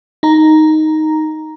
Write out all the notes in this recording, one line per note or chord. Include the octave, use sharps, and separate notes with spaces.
D#4 A#5